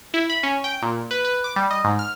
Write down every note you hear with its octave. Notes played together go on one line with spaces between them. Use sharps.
E4
B5
C#4
G5
A#2
B4
B4
D6
G3
D#5
G#2
F6